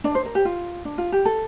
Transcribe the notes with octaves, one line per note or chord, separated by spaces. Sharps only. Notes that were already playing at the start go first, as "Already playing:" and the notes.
D4 D5
C5
A#4
G4
F4
D4
F4
G4
A4